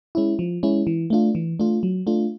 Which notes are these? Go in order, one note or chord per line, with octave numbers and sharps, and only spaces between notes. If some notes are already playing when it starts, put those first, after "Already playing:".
G#3 C#4 E4
F3
G#3 C#4 E4
E3
A3 D4 F4
E3
A3 D4 F4
F#3
A3 D4 F4